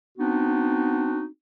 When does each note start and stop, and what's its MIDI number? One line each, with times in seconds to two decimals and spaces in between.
0.18 1.26 59
0.18 1.26 60
0.18 1.26 62
0.18 1.26 63
0.18 1.26 66